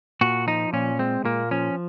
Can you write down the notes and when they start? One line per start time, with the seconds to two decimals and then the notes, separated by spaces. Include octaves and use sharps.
0.21 A#2 F#4
0.47 F3 D#4
0.73 A#2 C#4
0.99 G#3 C4
1.25 A#2 A#3
1.51 F3 C#4